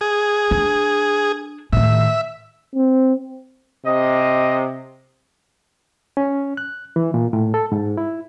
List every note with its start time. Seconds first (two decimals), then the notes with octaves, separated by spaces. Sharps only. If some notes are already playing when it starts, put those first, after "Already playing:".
0.01 G#4
0.51 D4
1.73 A2 D#3 E5
2.75 C4
3.85 C3 D#5
6.17 C#4
6.57 F#6
6.96 E3
7.14 A#2
7.33 A2
7.54 A4
7.72 G#2
7.98 E4